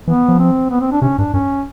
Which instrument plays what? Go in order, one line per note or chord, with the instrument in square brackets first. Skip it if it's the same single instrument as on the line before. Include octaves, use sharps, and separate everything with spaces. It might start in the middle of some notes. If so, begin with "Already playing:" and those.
[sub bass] E3 [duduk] B3
[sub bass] F3
[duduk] C4
B3
C4
D4
[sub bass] C3 [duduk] C#4
[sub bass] G2 [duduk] D4
[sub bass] F#2 [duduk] C#4